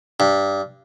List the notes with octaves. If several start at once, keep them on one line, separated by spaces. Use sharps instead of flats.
G2